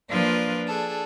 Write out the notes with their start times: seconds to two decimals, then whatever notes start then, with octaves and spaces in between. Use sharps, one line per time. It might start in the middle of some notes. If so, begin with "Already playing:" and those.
0.10 F3 A#3 D4 F4 B4 D5
0.67 D4 G#4 A4